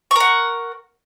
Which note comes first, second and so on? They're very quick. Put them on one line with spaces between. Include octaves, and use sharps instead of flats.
C#6 A#4 F#5